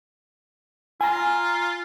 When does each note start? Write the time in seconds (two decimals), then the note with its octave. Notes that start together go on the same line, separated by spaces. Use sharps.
1.01 F4 G#5 A#5